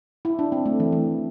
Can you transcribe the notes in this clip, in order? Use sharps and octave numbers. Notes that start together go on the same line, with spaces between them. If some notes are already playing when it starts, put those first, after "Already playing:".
E4
D4
C4
A3
E3
E3